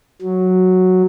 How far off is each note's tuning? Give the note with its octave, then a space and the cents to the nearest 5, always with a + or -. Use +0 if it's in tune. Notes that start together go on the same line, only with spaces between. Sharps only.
F#3 -5